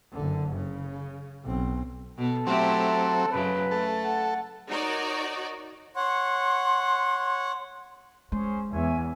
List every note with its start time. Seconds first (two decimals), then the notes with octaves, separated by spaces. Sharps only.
0.12 F#1 D3
0.56 C#3
1.44 B1 C4
2.18 B2 B3 A4
2.47 F#3 A3 C4 E4 G4
3.32 F#2 C#3 F#3 B4
3.71 A3 A4
4.05 F#5
4.69 D#4 F#4 A#4 C#5 D5
5.96 C#5 F#5 C6
8.32 G#3 C#4 G#4 C5
8.71 E2 C#5 E5 G#5